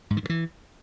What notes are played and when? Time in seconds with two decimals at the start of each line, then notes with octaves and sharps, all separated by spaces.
0.10 G#2
0.17 D#3
0.23 G2
0.29 E3